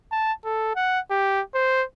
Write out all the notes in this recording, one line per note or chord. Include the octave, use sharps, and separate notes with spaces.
A5
A4
F#5
G4
C5